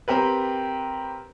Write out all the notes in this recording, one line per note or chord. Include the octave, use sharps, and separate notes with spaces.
C4 G4 A#4 B4